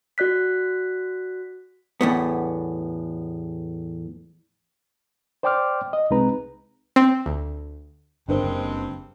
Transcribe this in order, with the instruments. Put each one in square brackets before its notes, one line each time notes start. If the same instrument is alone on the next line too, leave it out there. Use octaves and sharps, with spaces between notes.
[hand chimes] F#4 D5 F#6 B6
[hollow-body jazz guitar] E2 A2 B3
[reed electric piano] C5 D5 G5 C6 D6 F6
D#5
C2 G#3 C4 D#4 B4 A#5
[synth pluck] C4
D2
[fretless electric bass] G1 [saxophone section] G2 G#3 C4 [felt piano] D4 A#4 C5
[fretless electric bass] F#1